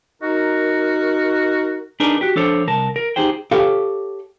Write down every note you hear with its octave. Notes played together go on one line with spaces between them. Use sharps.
D#4 F#4 A#4
D4 D#4 G#4 A#4 B4 D5
F#4 G4
F3 D4 A4 C5 C#5
C2 A#4 A5
A#4
D#4 G4 G#4 C5 G5
G4 A4 C#5 F5